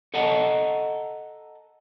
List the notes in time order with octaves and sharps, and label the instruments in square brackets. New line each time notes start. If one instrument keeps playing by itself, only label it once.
[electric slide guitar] A4 D#5 F#5 A5 A#5